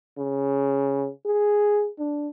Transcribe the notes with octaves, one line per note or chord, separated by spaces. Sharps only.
C#3
G#4
D4